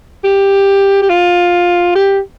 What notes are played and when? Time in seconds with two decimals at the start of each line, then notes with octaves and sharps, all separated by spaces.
0.24 G4
1.03 G4
1.09 F4
1.96 G4